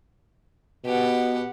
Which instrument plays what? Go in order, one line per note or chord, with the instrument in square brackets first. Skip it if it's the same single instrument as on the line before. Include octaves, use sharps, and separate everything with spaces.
[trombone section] B2 B3 [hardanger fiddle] G4 F#5